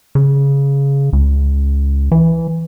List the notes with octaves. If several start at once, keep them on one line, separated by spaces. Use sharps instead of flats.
C#3
C#2
E3